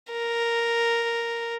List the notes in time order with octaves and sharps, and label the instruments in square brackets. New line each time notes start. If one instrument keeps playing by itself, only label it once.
[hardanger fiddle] A#4